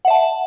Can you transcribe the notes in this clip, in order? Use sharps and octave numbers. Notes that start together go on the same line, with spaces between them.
E5 F#5 A5